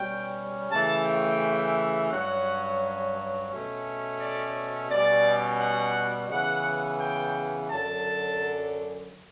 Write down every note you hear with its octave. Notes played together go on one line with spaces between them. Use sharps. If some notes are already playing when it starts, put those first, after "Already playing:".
Already playing: B2 G3 C#4 G5
C#3 E3 A3 A5
G5
G2 F#3 C#4 F#5
B2 A3 C#4
D5
B2 G3 C#4 D5
F#5
C#3 E3 B3 F#5
G5
F#2 D3 F#3 A5